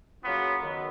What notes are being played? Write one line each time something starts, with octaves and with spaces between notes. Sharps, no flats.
C#3 F#3 A#3 B3 C#4 F4
D#3 F#3 B3